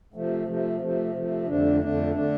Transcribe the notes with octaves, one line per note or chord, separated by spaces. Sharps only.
C3 F3 A3
C3 F3 A3
C3 F3 A3
C3 F3 A3
F2 D3 A3 D4
F2 D3 A3 D4
D3 A3 D4